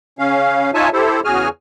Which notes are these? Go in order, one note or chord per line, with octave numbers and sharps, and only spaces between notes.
C#3 C#4 F5
D#4 F4 C#5 E5 G#5 A5
E4 G4 A4 C5
E2 C#3 F#4 G#4 G#5 F6